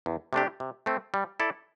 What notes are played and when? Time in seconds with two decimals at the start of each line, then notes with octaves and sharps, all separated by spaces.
0.06 E2
0.33 C3 A3 D4 G4
0.60 C3
0.86 A3 C4
1.14 G3
1.40 E4 A4 D5